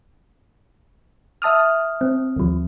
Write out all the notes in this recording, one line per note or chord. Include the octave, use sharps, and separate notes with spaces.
E5 A5 D#6 F6
C4
D#2 F3